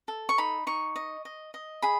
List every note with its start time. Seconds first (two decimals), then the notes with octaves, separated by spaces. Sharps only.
0.08 A4
0.29 C#6
0.38 D#4 B5
0.67 D#4 C#6
0.96 D#5
1.25 D#5
1.54 D#5
1.82 G#4 B5